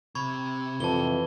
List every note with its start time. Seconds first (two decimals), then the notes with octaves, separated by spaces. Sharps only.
0.15 C3 B5 C#6 G#6
0.80 F2 E3 A5 G7